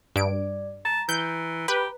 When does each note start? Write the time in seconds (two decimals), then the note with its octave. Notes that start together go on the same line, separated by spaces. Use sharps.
0.16 G2 D5 D7
0.85 A5 A#5
1.09 E3 G6
1.68 G4 B4